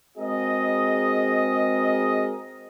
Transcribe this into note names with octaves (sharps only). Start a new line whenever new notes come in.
G#3 C4 F#4 G#4 A#4 D#5